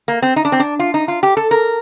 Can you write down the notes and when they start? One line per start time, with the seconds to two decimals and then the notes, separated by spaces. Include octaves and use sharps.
0.08 A#3
0.22 C4
0.36 D#4
0.45 D4
0.52 C4
0.60 D4
0.79 F4
0.94 D#4
1.08 F4
1.23 G4
1.37 A4
1.51 A#4